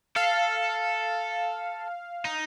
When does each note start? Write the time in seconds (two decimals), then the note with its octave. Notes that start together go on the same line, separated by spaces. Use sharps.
0.16 A4 F5
2.25 D#4